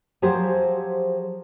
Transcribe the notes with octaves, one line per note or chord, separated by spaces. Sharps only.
F3 F#3 G4 G#4 C5